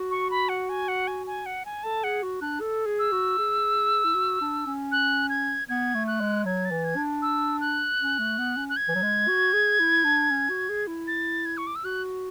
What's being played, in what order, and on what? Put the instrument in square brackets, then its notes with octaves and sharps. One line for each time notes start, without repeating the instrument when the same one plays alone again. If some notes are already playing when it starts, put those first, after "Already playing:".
Already playing: [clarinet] F#4
[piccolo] C#6
B5
F#5
G#5
F#5
G#5
G#5
F#5
G#5
[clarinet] A4 [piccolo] A5
[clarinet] G#4 [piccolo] F#5
[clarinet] F#4
[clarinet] D4 [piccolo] F#6
[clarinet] A4
G#4
[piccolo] E6
[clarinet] F#4
G#4
E4
F#4
D4
C#4
[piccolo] F#6
G#6
[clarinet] B3 [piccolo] G#6
[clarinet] A3
[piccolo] F#6
[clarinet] G#3
[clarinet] F#3 [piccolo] G#6
[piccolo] A6
[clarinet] E3
[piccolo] G#6
[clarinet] D4
[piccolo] E6
F#6
[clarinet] C#4
A3
B3
C#4
[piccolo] F#6
G#6
[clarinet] E3
F#3
G#3
F#4
G#4
E4
D4
C#4
F#4
G#4
E4
[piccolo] A6
G#6
C#6
D6
E6
[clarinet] F#4 [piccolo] F#6